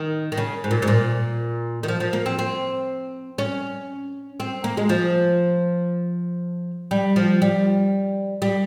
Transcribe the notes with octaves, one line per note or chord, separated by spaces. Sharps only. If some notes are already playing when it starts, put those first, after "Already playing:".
Already playing: D#3
D#3
C#3
G#2
A#2
G#2
A#2
D#3
F3
F3
A#3
C4
C4
C#4
C4
A#3
G#3
F3
G3
F3
G3
G3